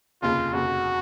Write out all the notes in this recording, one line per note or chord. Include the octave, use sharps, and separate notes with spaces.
F1 D#2 C#3 F4
F1 D#2 C#3 F#4